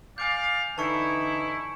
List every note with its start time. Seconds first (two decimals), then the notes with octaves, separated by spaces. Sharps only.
0.18 D5 F5 G#5 D6 G6
0.78 D3 E3 D#4 E4 A5 C#6 C#7